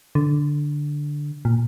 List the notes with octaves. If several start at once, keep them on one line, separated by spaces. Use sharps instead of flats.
D3
A#2